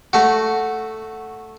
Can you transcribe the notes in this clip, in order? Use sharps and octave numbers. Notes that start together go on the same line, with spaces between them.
A3 F#4